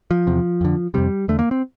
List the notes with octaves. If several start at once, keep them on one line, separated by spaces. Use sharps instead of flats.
F3
E2 C3
F2 D3
F2 C3 G3
E2 D3 A3
A#3
C4